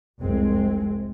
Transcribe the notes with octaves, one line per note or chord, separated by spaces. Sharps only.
F1 C2 G#3 C4